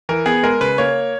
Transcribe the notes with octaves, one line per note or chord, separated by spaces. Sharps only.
E3 A#4
B3 G#4
G#3 A#4
C#3 B4
A#3 C#5